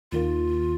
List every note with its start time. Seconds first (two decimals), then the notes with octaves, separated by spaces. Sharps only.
0.12 D#2 D#3 A#3 F4